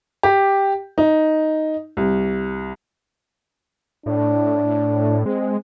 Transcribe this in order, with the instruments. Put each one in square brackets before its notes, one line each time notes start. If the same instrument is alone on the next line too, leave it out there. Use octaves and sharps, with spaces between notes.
[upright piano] G4
D#4
C2
[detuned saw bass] A2 [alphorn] D4
[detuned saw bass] G#3 [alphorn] C4